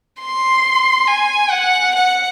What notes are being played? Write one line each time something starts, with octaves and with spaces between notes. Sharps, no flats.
C6
G#5
F#5
F#5